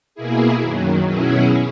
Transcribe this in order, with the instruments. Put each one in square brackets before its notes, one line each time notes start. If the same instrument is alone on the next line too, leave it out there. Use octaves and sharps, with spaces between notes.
[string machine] B2 A#3 E4 G#4
F#2 D#3 F#3
B2 F#3 C#4 E4 G#4